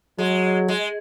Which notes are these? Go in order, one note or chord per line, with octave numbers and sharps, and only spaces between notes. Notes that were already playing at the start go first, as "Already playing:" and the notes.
F#3 G#3
G#3